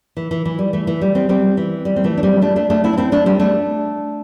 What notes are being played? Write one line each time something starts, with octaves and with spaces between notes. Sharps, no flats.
E3
E3
E3
G3
E3 A3
E3
G3
G3 C4
G3 C4
E3
G3
C4
E3 A3
D4
G3 C4
A3 D4
A3 D4
A3 D4
C4 E4
D4
C4 E4
A3 D4
G3 C4
A3 D4